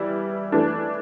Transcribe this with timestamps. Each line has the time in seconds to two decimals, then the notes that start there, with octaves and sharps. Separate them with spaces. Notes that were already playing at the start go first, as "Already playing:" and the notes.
Already playing: E3 G3 E4
0.52 E3 A3 D4